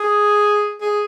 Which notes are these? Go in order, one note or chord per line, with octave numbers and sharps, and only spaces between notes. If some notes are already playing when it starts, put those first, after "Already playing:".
Already playing: G#4
G#4